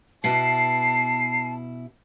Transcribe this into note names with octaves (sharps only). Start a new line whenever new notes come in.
B2 E4 A5 C7